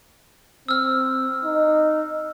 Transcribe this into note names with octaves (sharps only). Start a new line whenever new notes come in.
C4 E6 F6
D#4